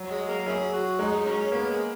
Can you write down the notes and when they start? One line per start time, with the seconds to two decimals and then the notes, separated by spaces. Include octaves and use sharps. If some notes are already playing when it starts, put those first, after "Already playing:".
Already playing: F#3
0.11 G#3
0.29 A#3
0.46 F#3 C#4 E4 G#4
0.73 F#4
0.99 G#3 D#4
1.26 F#3 A#3 C#4
1.52 A#3 B3
1.70 G#3